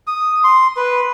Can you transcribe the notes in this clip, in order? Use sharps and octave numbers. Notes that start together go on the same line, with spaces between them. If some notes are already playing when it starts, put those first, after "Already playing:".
D#6
C6
B4